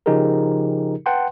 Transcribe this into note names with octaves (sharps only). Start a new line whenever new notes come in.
C#3 F3 D#4 G4 G#4 A#4
B4 F#5 G5 A5 C6